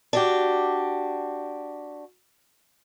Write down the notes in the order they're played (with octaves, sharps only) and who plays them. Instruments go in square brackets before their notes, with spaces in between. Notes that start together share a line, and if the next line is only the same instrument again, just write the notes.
[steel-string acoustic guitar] D4 F#4 G4